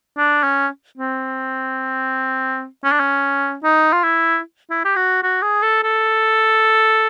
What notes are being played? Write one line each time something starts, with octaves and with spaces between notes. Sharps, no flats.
D4
C#4
C4
C#4
D4
C#4
D#4
F4
E4
E4
G4
F#4
F#4
G#4
A4
A4